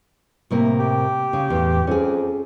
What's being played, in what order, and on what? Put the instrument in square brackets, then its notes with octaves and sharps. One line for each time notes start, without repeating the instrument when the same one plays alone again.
[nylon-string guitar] A2 C3 A#3
[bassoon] G4
[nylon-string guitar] C#3
E2 A2
[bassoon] F2 [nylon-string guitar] C#4 G#4